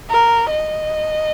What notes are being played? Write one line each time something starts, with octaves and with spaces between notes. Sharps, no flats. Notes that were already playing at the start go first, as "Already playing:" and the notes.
A#4
D#5